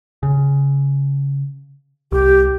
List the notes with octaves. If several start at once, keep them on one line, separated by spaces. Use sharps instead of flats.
C#3
C2 G4